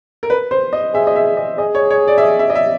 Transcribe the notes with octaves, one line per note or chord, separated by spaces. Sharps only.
A#4
B4
C5
D#5
G#4 E5
D#5
E5
D#5
G#4 D#5
C#5
C#5
D5
E5
D#5
E5
D#5
E5